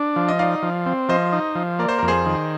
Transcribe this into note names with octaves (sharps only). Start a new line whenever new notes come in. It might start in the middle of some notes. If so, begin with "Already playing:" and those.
Already playing: D4
F3
D#5
D#4 D5 F5
F3
C4
F3 C5 D#5
D#4
F3
A#3 D5
C5
F2 A#4
G#4 C5
D#3